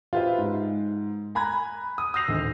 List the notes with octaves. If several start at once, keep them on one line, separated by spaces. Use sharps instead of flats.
F4 G4 B4 C5 E5
G#2
G#5 A#5 B5 F#6 G#6
D#6
D#6 E6 G6 A#6 C7 F7
G#1 D2 D3